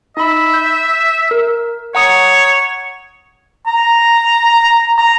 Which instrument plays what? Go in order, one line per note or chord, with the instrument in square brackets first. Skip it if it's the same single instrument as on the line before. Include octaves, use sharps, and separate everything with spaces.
[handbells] D#4 B5 [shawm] E5
[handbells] G6
A#4
[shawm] C#5 [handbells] F#5 A#5 D#6
[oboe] A#5
A#5